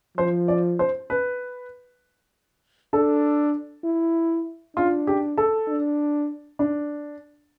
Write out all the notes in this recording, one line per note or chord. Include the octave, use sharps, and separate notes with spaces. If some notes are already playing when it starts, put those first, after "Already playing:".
F3 C5
D5
C5
B4
D4 A4
E4
D4 F4
G4
A4
D4
D4